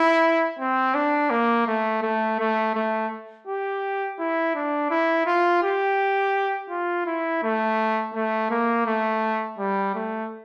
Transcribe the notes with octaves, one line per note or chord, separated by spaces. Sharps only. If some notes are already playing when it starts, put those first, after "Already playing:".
Already playing: E4
C4
D4
A#3
A3
A3
A3
A3
G4
E4
D4
E4
F4
G4
F4
E4
A3
A3
A#3
A3
G3
A3